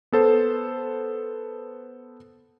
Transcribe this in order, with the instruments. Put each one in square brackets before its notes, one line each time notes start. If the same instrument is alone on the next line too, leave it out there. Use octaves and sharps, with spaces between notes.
[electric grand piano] B3 A4 C5